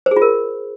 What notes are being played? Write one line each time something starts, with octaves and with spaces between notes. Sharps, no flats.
C5
G#4
F4
A#4